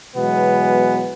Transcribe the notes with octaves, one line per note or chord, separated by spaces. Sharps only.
B2 E3 F#3 G#3 B3